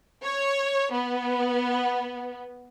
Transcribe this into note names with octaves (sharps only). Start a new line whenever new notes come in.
C#5
B3